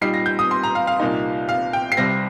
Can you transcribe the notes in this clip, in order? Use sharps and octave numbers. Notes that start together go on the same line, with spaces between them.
A#2 G3 D#4 C7
A#6
G6
D#6
C6
A#5
F5
F5
C2 A#2 A#3 D#4
F5
G5
C7
C2 C3 G3 C4 A#6